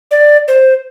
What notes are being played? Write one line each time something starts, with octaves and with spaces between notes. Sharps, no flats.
D5
C5